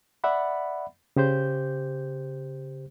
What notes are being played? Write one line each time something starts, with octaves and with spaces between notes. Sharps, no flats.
D5 E5 F#5 B5
C#3 G4 C5 G6